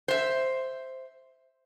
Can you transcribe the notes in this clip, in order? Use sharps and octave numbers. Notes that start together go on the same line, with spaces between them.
C5 E5